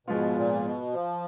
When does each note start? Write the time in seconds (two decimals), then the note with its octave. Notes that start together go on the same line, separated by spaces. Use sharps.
0.07 G#2 B2 F3 G#3 B3 F4
0.36 A#2
0.65 B2
0.93 F3